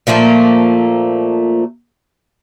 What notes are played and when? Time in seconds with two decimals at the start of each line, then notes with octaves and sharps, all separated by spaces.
0.07 A#2 F3 A3 A#3